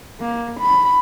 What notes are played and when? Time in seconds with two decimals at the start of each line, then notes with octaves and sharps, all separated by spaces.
0.20 A#3
0.60 B5